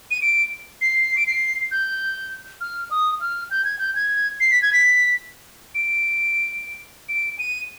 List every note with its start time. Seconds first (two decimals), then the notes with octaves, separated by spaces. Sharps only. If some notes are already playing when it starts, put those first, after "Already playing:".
0.11 D#7
0.22 D7
0.81 C7
1.17 D7
1.27 C7
1.71 G6
2.61 F6
2.91 D#6
3.21 F6
3.51 G6
3.65 G#6
3.79 G6
3.95 G#6
4.40 C7
4.51 B6
4.62 G#6
4.73 B6
5.75 D7
7.09 D7
7.39 D#7